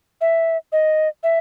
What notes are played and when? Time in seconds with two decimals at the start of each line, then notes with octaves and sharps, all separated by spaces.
0.21 E5
0.72 D#5
1.23 E5